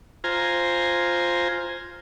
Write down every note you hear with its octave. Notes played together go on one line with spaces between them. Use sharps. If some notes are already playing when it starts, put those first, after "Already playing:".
F4 C5 G#5 A#5